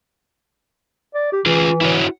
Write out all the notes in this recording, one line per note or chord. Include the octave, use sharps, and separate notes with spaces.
D5
G4
E3 F4 G#4
E4 F#4 C#5